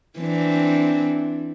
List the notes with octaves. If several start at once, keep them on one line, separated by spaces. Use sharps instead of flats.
E3 C4 D4